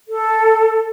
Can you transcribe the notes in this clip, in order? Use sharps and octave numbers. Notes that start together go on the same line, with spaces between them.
A4